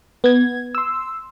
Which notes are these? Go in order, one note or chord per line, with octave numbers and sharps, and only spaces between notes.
B3 G#6
C6 E6